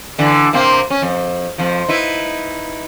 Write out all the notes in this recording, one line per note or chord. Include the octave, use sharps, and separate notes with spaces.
D3 E3
C3 A#3 C4
C#4
F2
F2 F3
D#4 E4 B4